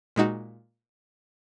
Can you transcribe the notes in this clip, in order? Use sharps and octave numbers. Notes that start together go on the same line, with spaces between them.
A#2 G#3 D#4 F#4